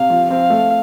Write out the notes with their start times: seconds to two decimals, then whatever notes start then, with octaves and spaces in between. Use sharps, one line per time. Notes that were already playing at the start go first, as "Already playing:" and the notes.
Already playing: C3 F5
0.10 F3
0.30 C4 F5
0.50 A3